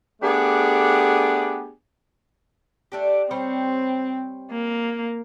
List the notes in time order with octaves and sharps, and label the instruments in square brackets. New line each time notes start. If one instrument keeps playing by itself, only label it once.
[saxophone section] A3 B3 D4 G4 G#4
[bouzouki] A3 D4 G4
[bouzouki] G3 C5 C#5 [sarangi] C4
[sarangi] A#3